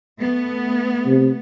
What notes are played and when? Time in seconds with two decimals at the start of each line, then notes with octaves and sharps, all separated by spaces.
0.19 A3 B3
1.07 C3